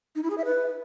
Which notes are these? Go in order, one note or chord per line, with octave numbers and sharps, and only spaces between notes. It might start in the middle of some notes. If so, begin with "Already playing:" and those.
D#4
E4
G#4
E5
B4